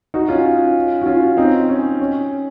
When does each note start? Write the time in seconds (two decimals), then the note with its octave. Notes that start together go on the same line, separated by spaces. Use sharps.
0.14 D#4 F#4
0.28 C#4 F4
1.02 F#4
1.06 C#4 F4
1.37 C4 D#4
1.68 C#4
2.00 C#4